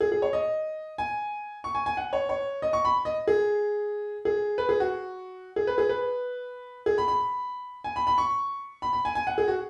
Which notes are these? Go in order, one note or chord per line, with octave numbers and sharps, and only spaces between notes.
G#4
G#4
C#5
D#5
G#5
C#6
G#5
G#5
F#5
C#5
C#5
D#5
C#6
B5
D#5
G#4
G#4
B4
G#4
F#4
G#4
B4
G#4
B4
G#4
B5
B5
G#5
B5
B5
C#6
B5
B5
G#5
G#5
F#5
G#4
F#4